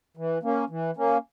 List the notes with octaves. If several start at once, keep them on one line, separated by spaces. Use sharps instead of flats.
E3
A#3 C#4
E3
A#3 C#4